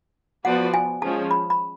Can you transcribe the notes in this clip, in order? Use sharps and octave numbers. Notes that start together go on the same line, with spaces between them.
F3 B3 F#4 B4 D5 F#5
G#5
F3 G#3 C#4 G#4 A5
B5
B5